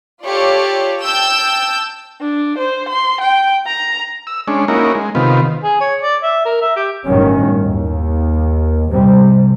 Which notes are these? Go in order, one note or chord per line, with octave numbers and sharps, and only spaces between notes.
F4 G4 A4 C#5 D5
G5 A5 E6 G6
D4
C5
C6
G5
A#5
E6
G#3 C#4 D4
A#3 C#4 D#4 E4 F#4 A#4
G#3
C3 D#3 B3 F4
G#4
C#5
D5
E5
A#4
E5
G4
G1 A2 D#3 F#3 C#4
D#2
G#2 C3 G3